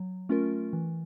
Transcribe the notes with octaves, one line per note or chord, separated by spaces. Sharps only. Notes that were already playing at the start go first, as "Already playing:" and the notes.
Already playing: F#3
A3 C#4 F4 A#4
E3